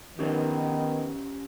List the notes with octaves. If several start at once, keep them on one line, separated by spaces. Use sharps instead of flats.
D#3 F3 B3 C#4 G4